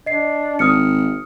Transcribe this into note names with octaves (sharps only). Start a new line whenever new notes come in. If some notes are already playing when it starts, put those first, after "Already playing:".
D4 D#5 C7
G#1 D#6 F6 C#7